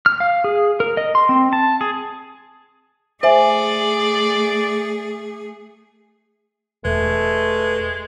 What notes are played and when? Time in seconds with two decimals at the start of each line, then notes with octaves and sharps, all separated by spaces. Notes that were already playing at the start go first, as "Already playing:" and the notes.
0.06 F6
0.20 F5
0.44 G#4
0.80 A#4
0.97 D#5
1.15 C6
1.29 C4
1.53 A5
1.81 G#4
3.23 A3 G#4 C5 D5 E5 G#5
6.85 E1 G#3 A3 B4